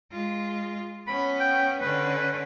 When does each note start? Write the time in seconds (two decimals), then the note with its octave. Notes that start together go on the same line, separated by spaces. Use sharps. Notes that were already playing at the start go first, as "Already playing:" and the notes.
0.12 G#3 F4
1.08 B3 C#4 B5
1.40 G5
1.81 D3 C#4 B4